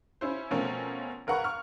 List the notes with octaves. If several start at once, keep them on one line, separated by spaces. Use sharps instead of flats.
C#4 E4 C5
B2 F3 A3 C4 C#4 A#4
G#1 A#4 B4 F#5 A#5 C#6
C#6 F6